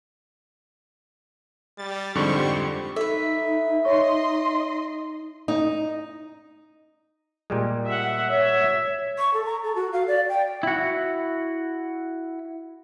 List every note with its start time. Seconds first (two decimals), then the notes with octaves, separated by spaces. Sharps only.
1.78 G3 A6
2.15 F2 G#2 D3 G3 G4 C5 C#6
2.96 D#4 A4 B4 E5
3.85 C#5 D#5 C6 C#6
5.48 D#4
7.50 A#2 G3 G#3
7.86 E5 F#5
8.28 C#5 E5
9.18 C#6
9.34 A4
9.46 A#5
9.64 A4
9.76 F#4
9.93 F5
10.08 D5
10.29 G5
10.63 E4 F#4